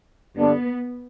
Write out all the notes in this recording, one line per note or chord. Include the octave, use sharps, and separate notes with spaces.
G2 D3 G3 B3 D4 A4